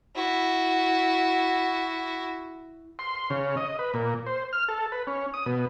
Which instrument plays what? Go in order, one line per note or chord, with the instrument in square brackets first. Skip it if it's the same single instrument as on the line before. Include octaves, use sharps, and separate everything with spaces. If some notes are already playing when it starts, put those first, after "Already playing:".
[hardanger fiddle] E4 F#4
[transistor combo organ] C6
C#3
D#5
B4
A#2
C5
F6
A4
B4
C#4
D#6
B2